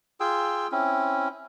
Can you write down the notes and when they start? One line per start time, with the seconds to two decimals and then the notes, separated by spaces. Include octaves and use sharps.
0.20 F4 G#4 G5 E6
0.72 C4 C#4 E4